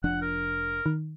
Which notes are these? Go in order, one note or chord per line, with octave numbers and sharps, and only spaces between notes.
F1 F3 D4 F#5
A#4
D#3